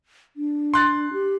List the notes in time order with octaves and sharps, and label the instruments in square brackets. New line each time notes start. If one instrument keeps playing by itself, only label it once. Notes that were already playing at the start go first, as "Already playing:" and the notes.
[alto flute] D4
[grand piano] C6 F#6 A6
[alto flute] G4